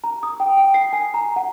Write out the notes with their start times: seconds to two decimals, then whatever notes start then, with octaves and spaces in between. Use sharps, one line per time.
0.04 A#5
0.23 D#6
0.40 G5
0.57 G5
0.74 C7
0.93 G#5
1.14 A#5
1.36 F#5